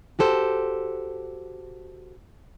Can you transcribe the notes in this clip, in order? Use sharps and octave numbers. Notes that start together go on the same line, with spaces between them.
F#4 G4 A4 C5